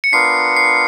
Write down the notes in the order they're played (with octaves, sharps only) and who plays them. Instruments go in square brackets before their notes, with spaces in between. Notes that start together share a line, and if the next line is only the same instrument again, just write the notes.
[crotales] C#7
[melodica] B3 D4 F4 A#4 [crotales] C7
[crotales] C7